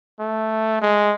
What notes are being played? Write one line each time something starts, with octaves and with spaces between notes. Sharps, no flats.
A3
G#3